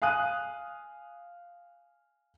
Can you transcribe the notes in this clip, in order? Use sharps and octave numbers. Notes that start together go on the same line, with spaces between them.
F5 G#5 D#6 F#6 D#7